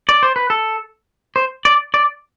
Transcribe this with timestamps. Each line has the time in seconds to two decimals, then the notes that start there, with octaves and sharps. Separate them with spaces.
0.09 D5
0.23 C5
0.36 B4
0.50 A4
1.36 C5
1.65 D5
1.94 D5